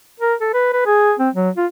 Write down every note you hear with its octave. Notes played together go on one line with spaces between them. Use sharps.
A#4
A4
B4
B4
G#4
C4
F#3
F4